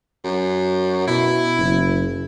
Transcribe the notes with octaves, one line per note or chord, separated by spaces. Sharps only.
F#2
B2 E4
F#1